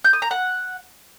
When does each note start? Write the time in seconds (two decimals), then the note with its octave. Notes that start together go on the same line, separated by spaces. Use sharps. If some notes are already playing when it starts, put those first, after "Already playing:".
0.04 G6
0.13 D#6
0.22 A#5
0.31 F#5